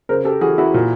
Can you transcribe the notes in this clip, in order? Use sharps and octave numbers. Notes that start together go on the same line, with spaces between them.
C#3 A#4 C5
G4 A4
E3 F#4 G#4
E4 F#4
A#2